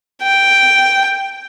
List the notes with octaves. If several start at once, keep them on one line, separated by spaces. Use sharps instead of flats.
G5